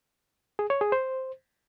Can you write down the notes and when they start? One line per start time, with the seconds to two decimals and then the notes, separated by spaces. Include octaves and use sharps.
0.59 G#4
0.70 C#5
0.81 G#4
0.92 C5